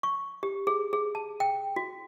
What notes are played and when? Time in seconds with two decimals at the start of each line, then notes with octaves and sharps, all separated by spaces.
0.03 C#6
0.43 G4
0.67 G#4
0.93 G#4
1.15 A5
1.40 G5
1.76 F#4